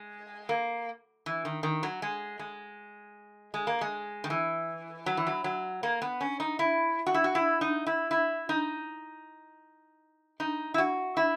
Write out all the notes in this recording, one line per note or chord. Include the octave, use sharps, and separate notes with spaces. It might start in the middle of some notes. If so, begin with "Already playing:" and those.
Already playing: G#3
A#3
E3
D#3
D#3
F#3
G#3
G#3
G#3
A#3
G#3
D#3
E3
F#3
E3
F#3
F#3
A#3
B3
C#4
D#4
E4
F#4
E4
F#4
E4
D#4
E4
E4
D#4
D#4
E4
F#4
E4